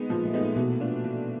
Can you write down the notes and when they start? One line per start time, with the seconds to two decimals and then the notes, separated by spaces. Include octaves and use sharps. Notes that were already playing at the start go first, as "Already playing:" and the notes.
Already playing: G#3 B3 D#4
0.09 A#2 F3 A#3
0.26 A3
0.33 G#3 B3 D#4
0.41 A#2 A#3
0.56 B2 E3 B3
0.80 A3 D4 F4
1.04 E3